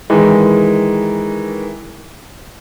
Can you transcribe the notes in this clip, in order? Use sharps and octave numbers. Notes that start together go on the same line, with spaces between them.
D#3 E3 G#3